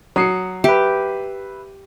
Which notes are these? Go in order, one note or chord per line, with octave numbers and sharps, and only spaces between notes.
F#3 D#6 C7 C#7
G4 B4 E5